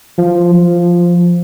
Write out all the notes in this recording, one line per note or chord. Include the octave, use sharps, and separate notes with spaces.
F3
F3